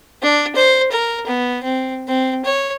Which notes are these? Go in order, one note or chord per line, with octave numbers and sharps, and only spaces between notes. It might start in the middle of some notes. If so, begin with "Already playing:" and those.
D4
C5
A#4
B3
C4
C4
C#5